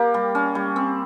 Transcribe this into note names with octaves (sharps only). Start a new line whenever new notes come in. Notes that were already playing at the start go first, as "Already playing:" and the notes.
Already playing: A#3 G4
G3
C#4
G3
C4